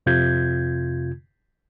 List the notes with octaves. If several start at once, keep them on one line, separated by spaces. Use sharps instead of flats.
F2 C3 F4 G6 G#6